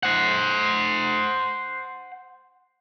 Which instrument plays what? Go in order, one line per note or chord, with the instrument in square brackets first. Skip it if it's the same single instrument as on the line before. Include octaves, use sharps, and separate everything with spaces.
[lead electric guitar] C5 F#5